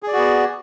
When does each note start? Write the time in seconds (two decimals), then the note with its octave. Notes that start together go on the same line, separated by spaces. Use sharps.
0.03 G#4
0.08 D5
0.13 F#4
0.18 B3